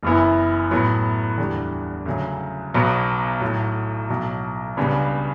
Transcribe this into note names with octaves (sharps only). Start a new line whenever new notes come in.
F#1 F#2 E3 B3 E4
A2 F#3 B3
E2 D3 G3
D2 C#3 F#3
B1 B2 F#3 B3
B1 A2 F#3
B1 B2 F#3
C#2 C#3 G3 B3 D4